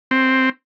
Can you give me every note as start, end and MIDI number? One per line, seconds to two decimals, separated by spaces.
0.11 0.49 60